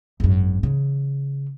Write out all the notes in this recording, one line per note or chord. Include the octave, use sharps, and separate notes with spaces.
G#1 F#2
C#3 E3